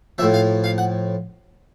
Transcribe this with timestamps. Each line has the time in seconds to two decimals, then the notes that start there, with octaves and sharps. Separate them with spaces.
0.18 A2 F3 E5
0.34 F5
0.64 F5
0.78 F#5